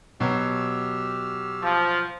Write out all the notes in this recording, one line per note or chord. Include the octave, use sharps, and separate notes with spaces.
B2 F#3 G4 E6 F6
F3